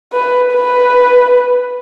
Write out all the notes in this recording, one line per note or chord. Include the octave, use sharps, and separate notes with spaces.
B4
B4